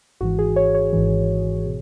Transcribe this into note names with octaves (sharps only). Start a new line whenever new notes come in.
G#1 G#2 E3 F#4
G#4
C#5
C#5
G#1 G#2 E3
B2